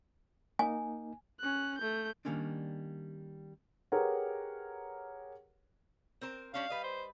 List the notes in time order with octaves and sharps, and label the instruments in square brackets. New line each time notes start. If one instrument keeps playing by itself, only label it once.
[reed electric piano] A#3 D#4 [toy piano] G#5
[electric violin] C#4 F#6
A3 G6
[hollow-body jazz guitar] D#3 F3 G3 A#3 C#4 D4
[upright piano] G4 G#4 A#4 B4 C#5 F#5
[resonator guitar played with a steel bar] C4 A#4 C5
[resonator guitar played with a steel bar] G3 C#4 D4 [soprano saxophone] F5
[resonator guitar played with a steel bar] G3 B4 D#5
[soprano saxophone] C5